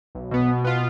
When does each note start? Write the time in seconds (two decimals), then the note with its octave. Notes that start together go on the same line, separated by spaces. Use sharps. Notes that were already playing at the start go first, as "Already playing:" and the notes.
0.15 B1
0.31 B2 B3
0.48 B2
0.64 B3 F4